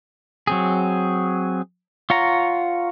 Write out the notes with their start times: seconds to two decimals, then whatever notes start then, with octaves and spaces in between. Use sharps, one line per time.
0.47 F#3 C4 G#4
2.10 F4 C#5 F#5 A#5